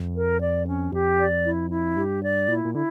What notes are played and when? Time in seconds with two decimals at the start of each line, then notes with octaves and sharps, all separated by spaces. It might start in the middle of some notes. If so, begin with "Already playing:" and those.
Already playing: F2
0.16 A#4
0.41 D5
0.67 C#4
0.92 F2 G4
1.19 D5
1.44 E4
1.70 E4
1.96 G2 G4
2.23 D5
2.48 A#2 E4
2.65 A#2
2.74 D3 E4